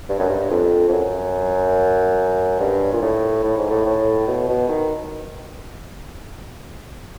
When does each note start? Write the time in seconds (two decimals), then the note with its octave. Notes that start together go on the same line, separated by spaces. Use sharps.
0.09 G2
0.19 F#2
0.29 G2
0.51 F2
0.89 F2
0.93 F#2
2.60 G2
2.93 A#2
3.02 A2
3.43 A2
3.57 G#2
3.70 A2
3.85 A2
4.27 B2
4.49 B2
4.68 D#3